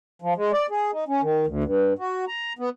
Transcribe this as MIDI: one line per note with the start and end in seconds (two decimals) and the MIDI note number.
0.22 0.34 53
0.36 0.52 56
0.52 0.67 74
0.70 0.91 68
0.92 1.04 63
1.08 1.21 61
1.22 1.46 51
1.47 1.64 38
1.64 1.93 43
1.99 2.25 66
2.28 2.53 82
2.59 2.69 59